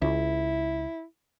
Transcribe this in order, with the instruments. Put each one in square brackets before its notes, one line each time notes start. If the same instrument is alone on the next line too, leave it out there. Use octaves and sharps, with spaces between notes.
[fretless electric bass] C#2 [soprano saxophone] E4